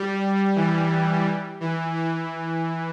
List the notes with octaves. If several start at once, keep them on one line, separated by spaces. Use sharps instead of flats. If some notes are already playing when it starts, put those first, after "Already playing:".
Already playing: G3
E3
E3
E3